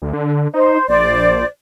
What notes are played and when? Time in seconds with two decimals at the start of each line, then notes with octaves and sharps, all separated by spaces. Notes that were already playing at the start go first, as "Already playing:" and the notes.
0.02 D2
0.13 D3
0.54 D#4 C5
0.89 A#1 C5 D5